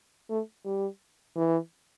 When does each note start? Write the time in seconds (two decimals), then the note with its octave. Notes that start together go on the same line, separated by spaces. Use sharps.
0.30 A3
0.65 G3
1.36 E3